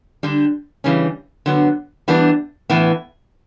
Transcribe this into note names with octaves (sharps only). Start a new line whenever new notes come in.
D3 G3 D4
C#3 E3 G3 C#4
D3 F#3 B3
E3 G3 B3 D4
A2 E3 B3 E4